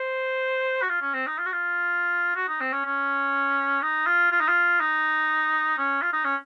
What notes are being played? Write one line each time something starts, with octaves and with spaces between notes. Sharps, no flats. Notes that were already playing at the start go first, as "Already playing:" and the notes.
Already playing: C5
F#4
F4
C#4
C4
D#4
F4
F#4
F4
F#4
D#4
C4
C#4
C#4
D#4
F4
F4
D#4
F4
D#4
C#4
F4
D#4
C#4